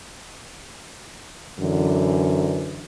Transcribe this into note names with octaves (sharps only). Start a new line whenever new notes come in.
F#2 D3 E3